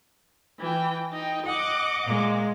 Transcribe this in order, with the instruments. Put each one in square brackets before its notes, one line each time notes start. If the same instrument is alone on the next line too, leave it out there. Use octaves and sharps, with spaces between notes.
[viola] E3 G5
D#4 G5
[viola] D#5 D6 [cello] F#5
[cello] A#2 G#3